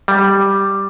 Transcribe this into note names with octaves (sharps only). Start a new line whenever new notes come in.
G3